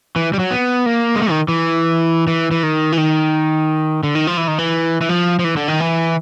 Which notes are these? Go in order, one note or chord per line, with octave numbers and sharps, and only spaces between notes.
E3
G3
F#3
B3
A#3
G#3
A3
D#3
E3
E3
E3
D#3
E3
D#3
D3
D#3
F3
E3
D#3
E3
E3
F3
F3
E3
D3
D#3
E3